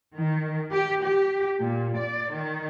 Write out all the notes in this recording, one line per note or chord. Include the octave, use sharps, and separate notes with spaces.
D#3
G4
G4
A#2
D5
D#3